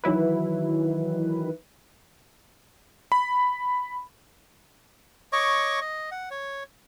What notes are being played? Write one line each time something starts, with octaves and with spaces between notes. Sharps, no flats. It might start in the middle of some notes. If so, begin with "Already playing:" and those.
D#3 E3 F#3 E4 B4
B5
C#5 D#5 C#6 D6
D#5
F#5
C#5